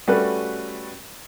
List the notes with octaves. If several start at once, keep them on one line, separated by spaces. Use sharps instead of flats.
G3 A3 C#4 F#4 B4